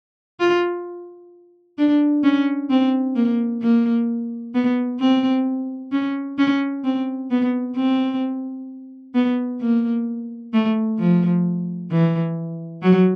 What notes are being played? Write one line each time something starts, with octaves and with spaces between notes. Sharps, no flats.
F4
D4
C#4
C4
A#3
A#3
B3
C4
C#4
C#4
C4
B3
C4
B3
A#3
A3
F3
E3
F#3